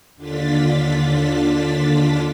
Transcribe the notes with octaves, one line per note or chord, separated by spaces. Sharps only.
D#2 D3 D4 F4 A6 B6